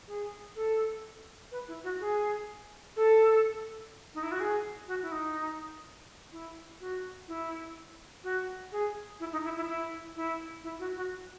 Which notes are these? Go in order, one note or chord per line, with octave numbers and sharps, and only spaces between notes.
G#4
A4
B4
E4
F#4
G#4
A4
D#4
E4
F#4
G#4
F#4
E4
D#4
E4
F#4
E4
F#4
G#4
E4
D#4
E4
E4
E4
E4
E4
F#4
F#4